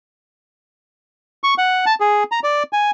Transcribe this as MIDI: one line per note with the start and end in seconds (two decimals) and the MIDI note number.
1.44 1.54 85
1.58 1.85 78
1.86 1.95 81
2.00 2.24 68
2.32 2.40 82
2.44 2.63 74
2.73 2.91 80